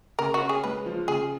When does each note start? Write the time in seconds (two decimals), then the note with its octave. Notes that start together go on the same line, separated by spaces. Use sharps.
0.19 C#3 A#4
0.34 F#4
0.41 C#4
0.49 G#4
0.64 G#3 B4
0.86 F3
1.08 C#3 G#4